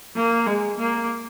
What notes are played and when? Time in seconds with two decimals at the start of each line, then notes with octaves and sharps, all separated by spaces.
0.16 A#3
0.47 G#3
0.78 A#3